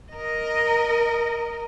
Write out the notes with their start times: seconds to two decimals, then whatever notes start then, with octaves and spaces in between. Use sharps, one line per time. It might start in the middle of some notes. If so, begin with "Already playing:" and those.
0.12 A#4 D#5